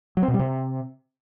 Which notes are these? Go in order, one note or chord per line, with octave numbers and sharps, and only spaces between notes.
F#3
C4
B2
G3
C3